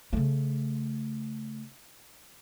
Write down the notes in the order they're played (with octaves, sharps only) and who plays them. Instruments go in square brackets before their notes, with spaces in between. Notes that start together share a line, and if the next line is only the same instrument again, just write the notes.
[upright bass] C#3 A3